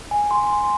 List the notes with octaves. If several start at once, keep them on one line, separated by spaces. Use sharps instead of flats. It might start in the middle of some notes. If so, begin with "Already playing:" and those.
G#5
C6